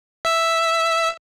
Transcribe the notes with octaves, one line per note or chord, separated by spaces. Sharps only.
E5 E6